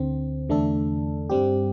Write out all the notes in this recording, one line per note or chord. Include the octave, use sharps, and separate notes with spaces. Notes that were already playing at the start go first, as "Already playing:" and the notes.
Already playing: D2 D3 C4
E2 D3 A3 D4 A4
G2 G3 C4 G4